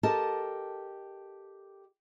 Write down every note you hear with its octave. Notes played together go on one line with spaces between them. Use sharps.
G4 A4 A#4 D#5 A5